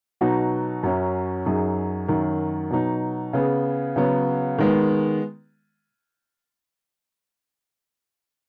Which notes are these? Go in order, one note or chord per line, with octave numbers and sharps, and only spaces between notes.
B2 F#3 D#4 F#4
F#2 F#3 C#4
F#2 F#3 D#4 G#4
F#2 D#3 F#3
B2 F#3 D#4
C#3 B3 G#4
C#3 F#3 B3
D#3 G#3 B3